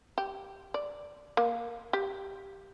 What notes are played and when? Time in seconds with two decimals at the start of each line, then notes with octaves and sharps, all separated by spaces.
0.18 G4
0.74 D5
1.37 A#3
1.93 G4